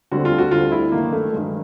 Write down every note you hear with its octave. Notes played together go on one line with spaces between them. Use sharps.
D2 D3 G3 C4 F#4
F4
F#4
D2 D3 G3 C4 F4
E4
G2 D#3 F#3 A#3
A3
G2 D#3 F#3 G#3